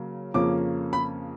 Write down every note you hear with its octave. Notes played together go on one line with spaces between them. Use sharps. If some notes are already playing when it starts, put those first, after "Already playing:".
Already playing: C#3 F#3 A#3
F2 C#3 F3 A#3 C#4 D6
B5